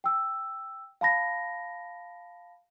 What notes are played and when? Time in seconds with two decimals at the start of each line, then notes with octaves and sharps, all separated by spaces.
0.04 G5 E6
1.01 F5 A5 B5 A#6